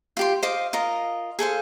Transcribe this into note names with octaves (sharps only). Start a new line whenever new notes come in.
F4 G4 C6
C5 D#5 F5 D6
F4 A#4 D#5
G#4 A4 C5 F5